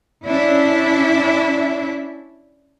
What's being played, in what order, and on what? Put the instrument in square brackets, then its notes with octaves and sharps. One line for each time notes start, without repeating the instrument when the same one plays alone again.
[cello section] C#4 D4 E4 E5